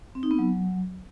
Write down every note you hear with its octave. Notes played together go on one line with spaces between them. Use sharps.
C4
D#4
B3
F#3